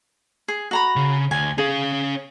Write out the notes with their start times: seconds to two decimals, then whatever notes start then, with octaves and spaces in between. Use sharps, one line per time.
0.48 G#4
0.71 F#4 A#5 B5
0.96 C#3
1.31 D2 G#5
1.58 C#4 G#4 F5